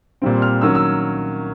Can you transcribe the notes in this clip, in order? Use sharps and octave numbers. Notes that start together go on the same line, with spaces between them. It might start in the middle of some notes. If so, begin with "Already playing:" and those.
A#2 G3 C4
F6
D#3 F#3 A#3 C#4 E6
E6